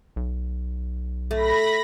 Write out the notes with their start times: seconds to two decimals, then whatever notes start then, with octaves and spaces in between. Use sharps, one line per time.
0.16 B1
1.31 A3 B5 A#6